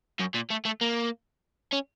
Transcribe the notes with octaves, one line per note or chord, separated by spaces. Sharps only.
F#2
A#2
A3
A3
A#3
C#4